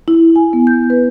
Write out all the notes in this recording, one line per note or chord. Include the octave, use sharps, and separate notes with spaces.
E4
G#5
B3
G6
B4